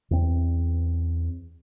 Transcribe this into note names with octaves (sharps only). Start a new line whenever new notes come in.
E2 C4